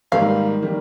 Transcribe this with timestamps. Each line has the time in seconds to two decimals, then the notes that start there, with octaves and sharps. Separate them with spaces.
0.12 G#2 D#3 G3 A#3 F5
0.62 D#3 G3 A#3